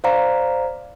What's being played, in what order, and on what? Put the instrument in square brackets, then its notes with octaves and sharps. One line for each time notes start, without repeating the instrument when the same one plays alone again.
[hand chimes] C5 D5 F5 A#5